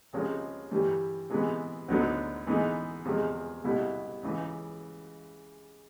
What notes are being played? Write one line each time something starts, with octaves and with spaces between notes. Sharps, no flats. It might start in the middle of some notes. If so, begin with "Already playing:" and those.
C#2 C3 F3 G#3 C#4
G2 E3 G3
C3 E3 G#3 B3
D2 D3 F#3 B3 D#4
E3 G#3 B3 D#4
E2 C3 F3 G#3
C2 B2 G3 B3 E4
C#2 C#3 E3